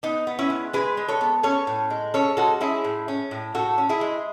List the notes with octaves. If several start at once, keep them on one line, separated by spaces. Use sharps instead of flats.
B3 D#4
B3
C#4 E4
G#3
G#3 G#4 B4
G#3
A4 C#5
B3
C#4 A4 C#5
A2
G#3
C#4 A4 C#5
G#3 F#4 A4
C#4 E4 G#4
A2
C#4
A2
A2 F#4 A4
C#4
E4 G#4
G#3